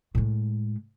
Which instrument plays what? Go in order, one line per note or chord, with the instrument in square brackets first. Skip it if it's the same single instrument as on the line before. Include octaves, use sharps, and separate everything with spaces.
[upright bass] A2 G#3